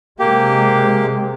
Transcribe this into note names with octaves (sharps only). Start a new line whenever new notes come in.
C3 G#3 A#3 G4